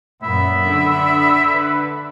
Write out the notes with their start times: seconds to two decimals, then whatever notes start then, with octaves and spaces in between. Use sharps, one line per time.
0.23 F#2 A#2 B3 E5 B5
0.63 D3
1.52 B4